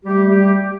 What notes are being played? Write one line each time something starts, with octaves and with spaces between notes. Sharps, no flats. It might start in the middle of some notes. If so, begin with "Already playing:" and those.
G3 A3 G4
G3 A3 G4